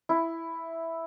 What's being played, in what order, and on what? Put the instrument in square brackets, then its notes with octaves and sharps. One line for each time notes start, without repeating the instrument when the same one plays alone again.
[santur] E4